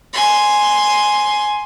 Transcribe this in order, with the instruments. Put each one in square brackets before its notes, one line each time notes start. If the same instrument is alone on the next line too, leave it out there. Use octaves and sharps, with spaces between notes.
[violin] G#5 C6